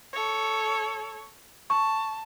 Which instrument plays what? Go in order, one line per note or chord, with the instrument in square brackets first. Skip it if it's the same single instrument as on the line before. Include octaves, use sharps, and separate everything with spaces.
[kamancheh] A4 C#5
[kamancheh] A5 [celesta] C#6